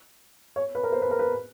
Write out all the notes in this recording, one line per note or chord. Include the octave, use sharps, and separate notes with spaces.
C#5
B4
A#4
C5
B4
A#4
B4